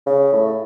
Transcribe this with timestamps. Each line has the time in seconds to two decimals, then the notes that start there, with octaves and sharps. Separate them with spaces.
0.07 C#3
0.33 A2